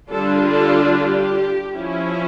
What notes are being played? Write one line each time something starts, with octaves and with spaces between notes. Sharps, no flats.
D3 G3 D4 F4 A4
A4
G4
F3 C#4 E4